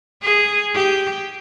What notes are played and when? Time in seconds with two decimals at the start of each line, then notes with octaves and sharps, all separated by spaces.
0.22 G#4
0.74 G4